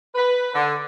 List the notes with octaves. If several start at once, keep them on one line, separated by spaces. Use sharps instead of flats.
B4
D3